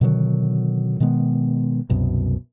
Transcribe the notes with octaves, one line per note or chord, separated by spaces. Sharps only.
B2 D3 D#3 F#3
B2 D#3 G#3 B3
C2 F#2 B2